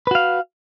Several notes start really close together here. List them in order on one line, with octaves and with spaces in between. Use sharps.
B4 F#4 F5